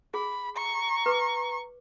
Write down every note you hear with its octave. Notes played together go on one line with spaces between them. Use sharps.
G#4 B5
A#5 C#6
B4 D6